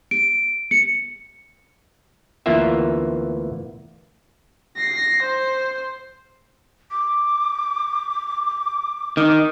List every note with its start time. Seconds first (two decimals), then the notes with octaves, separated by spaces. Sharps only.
0.11 D7
0.71 C#7
2.46 D2 E3 A#3 B3 F4 E5
4.76 A#6 C7
5.22 C5
6.91 D6
9.17 D#3